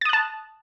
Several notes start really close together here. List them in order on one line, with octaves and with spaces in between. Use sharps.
A6 D#6 F#6 A5